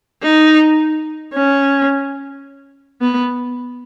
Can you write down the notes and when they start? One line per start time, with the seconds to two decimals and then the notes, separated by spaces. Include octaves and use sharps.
0.23 D#4
1.34 C#4
3.01 B3